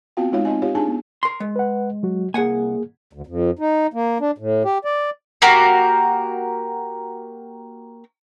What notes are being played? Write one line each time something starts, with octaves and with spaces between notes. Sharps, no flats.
B3 C4 F4 F#4 F5 G5
G#3 D#4 F4 C#5 F5
C4 D#4 D#5 G#5
F4 G4 C#5 F5
D4 D#4 G#4 G#5 A5
B3
A#4 C6
G#3
B4 F#5
F#3 F#4
C2 A#3 G#4 F#5 G#5
D2
F2
D#4
A#3
D4
A2
G4
D5
A#3 F#4 G4 A#4